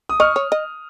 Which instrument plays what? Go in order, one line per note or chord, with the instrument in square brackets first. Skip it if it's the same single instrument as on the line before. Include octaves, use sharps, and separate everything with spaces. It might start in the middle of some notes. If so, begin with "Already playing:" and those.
[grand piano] D#6
[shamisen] D#5 [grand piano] C#6 F6
[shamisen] C#5
D#5